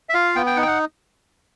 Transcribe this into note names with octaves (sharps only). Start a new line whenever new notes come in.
E5
F4 F5
B3 G5
G5
D#4 F#5
G5
F#5